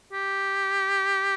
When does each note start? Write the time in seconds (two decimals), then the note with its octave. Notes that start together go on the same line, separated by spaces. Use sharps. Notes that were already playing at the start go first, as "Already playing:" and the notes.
0.13 G4